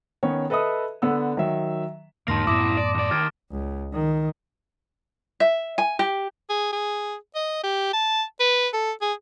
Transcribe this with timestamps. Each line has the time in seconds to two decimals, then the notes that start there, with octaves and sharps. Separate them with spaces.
0.23 D#3 B3 C#4 C#5
0.50 A4 B4 D#5 E5 D#6
1.02 D3 B3 E6
1.37 D#3 F#3 E5
2.28 E2 G#2 D3 A#3 D#4 A5 C6 A#6
2.47 C2 F#2 A2 B3 E4 D6 D#6 A#6
2.77 D5
2.95 D#2 D5
3.11 D#2 D#3 F6 G#6 A6 D7
3.51 C#2
3.93 D#3
5.40 E5
5.78 G#5
5.99 G4
6.50 G#4
6.72 G#4
7.35 D#5
7.64 G4
7.93 A5
8.40 B4
8.73 A4
9.02 G#4